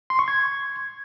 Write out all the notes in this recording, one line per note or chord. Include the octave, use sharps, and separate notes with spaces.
C6
C#6
G#6